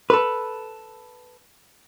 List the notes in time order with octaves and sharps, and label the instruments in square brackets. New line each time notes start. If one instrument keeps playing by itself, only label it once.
[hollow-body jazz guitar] A4 B4